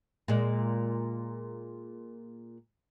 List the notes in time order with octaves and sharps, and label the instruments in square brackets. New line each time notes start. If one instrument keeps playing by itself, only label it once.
[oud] A#2 G#3